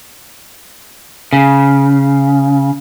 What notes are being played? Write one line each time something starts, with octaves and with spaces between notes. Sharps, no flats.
C#3